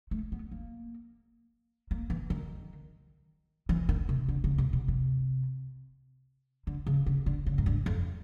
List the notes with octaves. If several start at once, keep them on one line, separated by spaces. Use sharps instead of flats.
A3
B3
A#3
A#3
E3
D#3
E3
D#3
C3
D3
C#3
C3
B2
C3
D3
C#3
C#3
D3
C#3
G#2
G2
F2